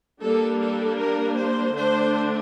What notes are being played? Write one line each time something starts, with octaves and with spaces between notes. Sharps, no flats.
G3 A#3 D4 A4
A4
A#4
C5
D3 A3 D4 C5